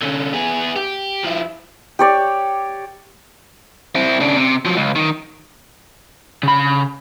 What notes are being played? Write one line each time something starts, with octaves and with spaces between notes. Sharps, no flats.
D3 C#4
B3 G#4
G4
F3 E4
G4 C#5 D5
C4 E4
C#3 D4
C3
F3 F#3
C#2
D#3
C#3 B5